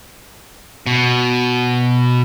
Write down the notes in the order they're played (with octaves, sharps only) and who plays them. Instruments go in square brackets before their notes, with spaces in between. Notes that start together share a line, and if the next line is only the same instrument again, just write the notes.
[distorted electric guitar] B2